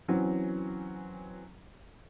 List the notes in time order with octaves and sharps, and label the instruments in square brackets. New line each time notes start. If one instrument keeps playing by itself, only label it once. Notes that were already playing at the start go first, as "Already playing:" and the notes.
[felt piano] E3 F#3 C4 C#4